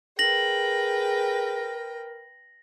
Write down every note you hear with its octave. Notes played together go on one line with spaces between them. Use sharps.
G#4 A#4 B4 G5 A#6 F#7